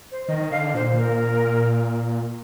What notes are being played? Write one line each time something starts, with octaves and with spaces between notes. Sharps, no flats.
C5
D#3 D#5
D#5
D3 F5
A#2 C5
A#4